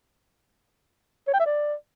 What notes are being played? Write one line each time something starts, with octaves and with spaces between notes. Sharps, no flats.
C#5
G5
E5
D5